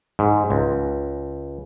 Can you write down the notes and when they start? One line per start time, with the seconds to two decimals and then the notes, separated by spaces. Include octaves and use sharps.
0.19 G#2
0.50 C#2